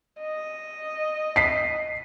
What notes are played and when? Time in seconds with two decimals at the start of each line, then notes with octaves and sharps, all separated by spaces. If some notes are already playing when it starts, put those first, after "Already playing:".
0.21 D#5
1.36 B6 C7